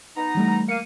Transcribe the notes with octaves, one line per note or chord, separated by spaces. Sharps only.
B3 D#4 A#5
E3 G3 A3
A#3 F5 C#7 D#7